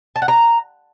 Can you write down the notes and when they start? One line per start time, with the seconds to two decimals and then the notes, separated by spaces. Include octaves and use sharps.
0.16 A5
0.22 F#5
0.28 A#5